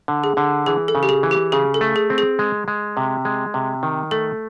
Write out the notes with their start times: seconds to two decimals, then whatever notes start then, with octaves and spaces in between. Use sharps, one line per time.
0.08 D3
0.24 G#4
0.37 D3
0.66 E3 G#4
0.88 A4
0.95 C#3
1.03 G4
1.09 G#4
1.23 E3
1.31 G4
1.52 C#3 G#4
1.74 A4
1.81 A3
1.96 G#4
2.10 C4
2.18 G#4
2.39 G#3
2.68 G#3
2.97 C3
3.25 G#3
3.54 C3
3.83 D#3
4.11 A3 A4